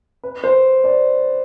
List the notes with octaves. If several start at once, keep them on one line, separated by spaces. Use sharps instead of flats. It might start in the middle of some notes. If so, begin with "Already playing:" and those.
B4
C5
D5